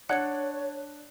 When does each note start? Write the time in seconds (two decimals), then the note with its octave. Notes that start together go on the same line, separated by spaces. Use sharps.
0.09 D4 C#5 F#5 F#6 G#6 C#7